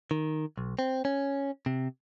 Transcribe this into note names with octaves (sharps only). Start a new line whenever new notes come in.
D#3
B1
C4
C#4
C3